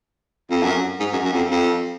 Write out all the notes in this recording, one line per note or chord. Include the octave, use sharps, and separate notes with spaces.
F2
F#2
G#2
F#2
F#2
F2
F2